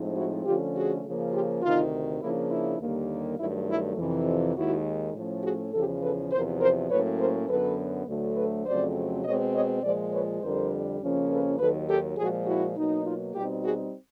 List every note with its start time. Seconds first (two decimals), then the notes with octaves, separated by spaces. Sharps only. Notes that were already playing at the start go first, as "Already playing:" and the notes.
Already playing: A2 F3 G#3 C4 D#4
0.16 E4 F#4
0.46 D3 F3 A3 C#4 F4 G4
0.75 F#4 G#4
1.04 C#3 F3 A#3 C#4
1.33 F4 G4
1.63 D2 C3 D#3 D#4 F4
2.22 C#3 F3 A#3 D4 E4
2.51 E4
2.80 D#2 D3 G3 A#3
3.39 G2 D#3 F#3 A3 E4
3.68 E4
3.97 F2 C3 E3
4.56 D#2 D#3 G#3 E4 F#4
5.14 A2 F3 A3 C#4
5.44 F#4 G#4
5.73 E2 C#3 F3 G4 A4
6.02 A4 B4
6.32 E2 C3 F3 A#4 C5
6.60 A#4 C5
6.90 A2 F#3 A#3 C#4 B4 C#5
7.20 A#4 C5
7.49 F#2 D3 F#3 B3 A4 B4
8.07 D2 D3 F#3 A3
8.37 A4 B4
8.66 F2 C#3 F#3 A3 C4 C5 D5
9.24 B2 G#3 C4 C#5 D#5
9.54 C#5 D#5
9.83 A#2 F3 G#3 C5 D5
10.12 B4 C#5
10.41 F2 D3 G3 A#4 C5
11.01 F2 C#3 F3 A#3 C#4
11.29 A4 B4
11.59 D#2 D#3 F#3 A4 B4
11.88 G4 A4
12.18 A#2 F3 G#3 F#4 G#4
12.47 E4 F#4
12.76 B2 F#3 A#3 D#4
13.06 D#4 F4
13.35 B2 G3 C4 D#4 F4 G4
13.64 F#4 G#4